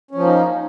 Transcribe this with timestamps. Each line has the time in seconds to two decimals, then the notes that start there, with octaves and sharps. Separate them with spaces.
0.11 C#4
0.15 F3
0.19 A#3
0.23 D#4